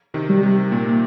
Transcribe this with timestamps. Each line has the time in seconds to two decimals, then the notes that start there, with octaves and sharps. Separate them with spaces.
0.14 C3 D#3
0.29 G3
0.43 C3
0.72 A#2 A#3